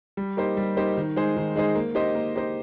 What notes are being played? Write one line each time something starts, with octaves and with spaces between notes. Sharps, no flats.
G3
A#3 D#4 G4 C5
G3
A#3 D#4 G4 C5
D#3
G#3 D#4 G#4 C5
D#3
G#3 D#4 G#4 C5
A#3
D#4 G4 C5 D#5
A#3
D#4 G4 C5 D#5